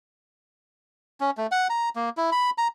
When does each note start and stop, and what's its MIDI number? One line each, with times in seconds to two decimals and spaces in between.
1.20 1.31 61
1.37 1.47 57
1.52 1.68 78
1.70 1.89 82
1.96 2.09 58
2.17 2.30 64
2.32 2.50 83
2.58 2.68 82